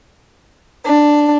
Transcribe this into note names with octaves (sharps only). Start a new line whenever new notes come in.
D4